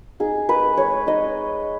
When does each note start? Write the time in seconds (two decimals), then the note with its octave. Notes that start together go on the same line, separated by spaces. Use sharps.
0.20 D#4 G#4
0.49 G#3 B4
0.77 G#3 C#5
1.07 D#4 D#5